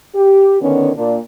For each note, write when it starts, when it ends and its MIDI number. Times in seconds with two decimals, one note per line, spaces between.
0.14 0.56 67
0.61 0.90 50
0.61 0.90 51
0.61 0.90 59
0.61 0.90 61
0.96 1.17 46
0.96 1.17 62